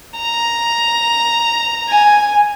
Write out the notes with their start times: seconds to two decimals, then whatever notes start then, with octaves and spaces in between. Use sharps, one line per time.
0.19 A#5
1.89 G#5